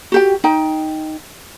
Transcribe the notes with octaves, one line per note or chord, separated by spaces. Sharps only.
F#4 G4 G5
D#4 G5